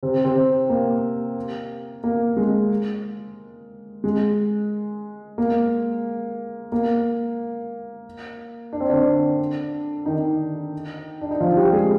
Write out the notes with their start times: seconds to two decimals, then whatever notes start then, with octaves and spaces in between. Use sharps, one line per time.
0.03 C3 C4
0.25 C3 C4
0.70 A#3
2.04 A#3
2.37 G#3
4.04 G#3
5.38 A#3
6.72 A#3
8.73 D4
8.80 C4
8.90 D3 D4
10.06 D#3 D#4
11.21 D4
11.31 D#4
11.40 F3 F4
11.57 G3 G4
11.73 G#3 G#4